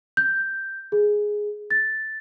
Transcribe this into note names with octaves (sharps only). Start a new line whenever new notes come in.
G6
G#4
A6